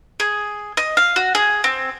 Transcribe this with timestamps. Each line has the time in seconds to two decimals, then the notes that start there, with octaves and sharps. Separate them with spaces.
0.20 G#4
0.77 D#5
0.97 F5
1.16 F#4
1.35 G#4
1.64 C4